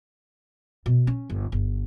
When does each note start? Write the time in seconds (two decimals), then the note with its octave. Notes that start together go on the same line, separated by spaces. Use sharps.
0.86 B2
1.07 C#4
1.30 G1
1.52 G1